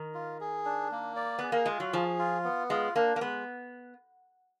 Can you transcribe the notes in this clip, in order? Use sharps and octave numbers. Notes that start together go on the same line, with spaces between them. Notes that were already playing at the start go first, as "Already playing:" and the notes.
Already playing: D#3
F4
G#4
D4
A#3
D5
B3 G#4
A#3
G#3 F4
F#3
F3 G#4
F4
B3
G#3 F4
A#3 D4
A#3
G#3 B3